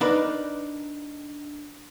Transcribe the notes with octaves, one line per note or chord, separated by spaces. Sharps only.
D4 D#4 A#4 B4 D5